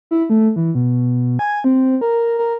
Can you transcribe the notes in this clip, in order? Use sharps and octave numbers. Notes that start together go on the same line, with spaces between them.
E4
A3
E3
B2
G#5
C4
A#4
A#4